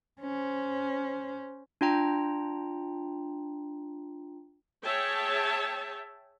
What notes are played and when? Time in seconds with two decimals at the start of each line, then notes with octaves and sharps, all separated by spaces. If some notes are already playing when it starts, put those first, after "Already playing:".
0.21 C#4 C5
1.81 D4 F4 G5 A#5
4.84 G#4 C#5 E5 G5 A5